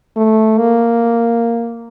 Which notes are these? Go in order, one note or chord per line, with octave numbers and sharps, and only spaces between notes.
A3
A#3